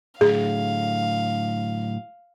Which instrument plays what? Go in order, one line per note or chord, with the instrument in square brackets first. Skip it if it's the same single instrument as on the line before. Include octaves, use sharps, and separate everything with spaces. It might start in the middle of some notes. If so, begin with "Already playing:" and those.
[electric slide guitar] A2 D3 F#3 [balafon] G#4 [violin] F5